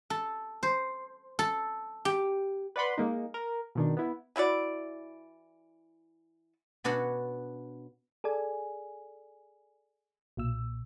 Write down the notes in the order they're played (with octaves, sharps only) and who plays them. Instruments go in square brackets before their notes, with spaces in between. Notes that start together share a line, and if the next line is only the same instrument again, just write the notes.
[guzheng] A4
C5
A4
G4
[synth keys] B4 D5 F#5 B5 C6
G#3 A#3 D#4
A#4
B2 D#3 D4
B3 E4
[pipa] E3 E4 F#4 D5
[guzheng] B2 B3 D4 F#4 C#5
[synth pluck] G#4 A4 D5 G#5
B1 A#2 E6